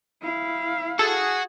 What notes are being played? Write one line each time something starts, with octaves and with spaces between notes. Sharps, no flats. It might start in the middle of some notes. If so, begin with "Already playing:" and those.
E4 F5
F#4 G#4 A4